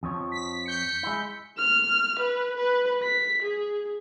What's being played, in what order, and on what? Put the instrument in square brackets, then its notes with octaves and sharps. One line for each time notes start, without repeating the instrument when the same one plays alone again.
[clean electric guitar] F2 F3 C#5
[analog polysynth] B6
G6 B6 C#7
[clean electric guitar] G#3 E4
[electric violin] F6
B4
B4
B6
G#4